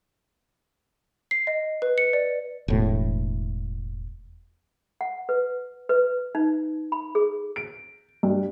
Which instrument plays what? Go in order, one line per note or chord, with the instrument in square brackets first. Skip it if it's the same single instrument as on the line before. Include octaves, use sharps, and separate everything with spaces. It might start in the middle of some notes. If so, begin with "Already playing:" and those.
[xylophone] C7
D#5
B4
C#7
D5
[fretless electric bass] E1 A2
[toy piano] F#5
B4
B4
D#4
B5
G#4
[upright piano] D7
G2